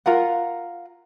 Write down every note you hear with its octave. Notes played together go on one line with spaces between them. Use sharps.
F4 A#4 F#5